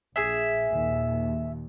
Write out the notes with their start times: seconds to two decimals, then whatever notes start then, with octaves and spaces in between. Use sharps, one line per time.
0.16 A#1 G#4 E5
0.68 D#2 A#2